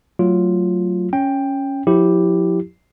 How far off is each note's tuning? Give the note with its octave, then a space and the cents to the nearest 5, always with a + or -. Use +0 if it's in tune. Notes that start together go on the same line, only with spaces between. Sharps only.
F#3 +0 A3 +15 F4 +0
C#4 +0 G5 +10
F3 +40 E4 +0 G4 +0